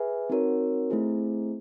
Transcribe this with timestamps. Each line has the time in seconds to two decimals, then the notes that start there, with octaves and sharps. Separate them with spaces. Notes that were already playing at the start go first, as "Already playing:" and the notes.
Already playing: G#4 B4 E5 G#5
0.30 C4 D#4 F#4 A#4 C#5
0.90 A3 C4 E4 G#4 C5